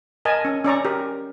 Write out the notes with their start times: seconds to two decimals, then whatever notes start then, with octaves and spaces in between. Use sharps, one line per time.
0.25 A#4 D#5 G#5 A5
0.45 C#4
0.64 C#4 D5 A#5 C#6
0.85 G4 A#4